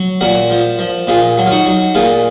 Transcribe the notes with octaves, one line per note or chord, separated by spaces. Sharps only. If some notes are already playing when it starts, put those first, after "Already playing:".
Already playing: F#3
A#2 F#4 A#4
F3
F3
A#2 F4 G#4
F#3
F4
D#4 F#4
F#3
A#2 F4 G#4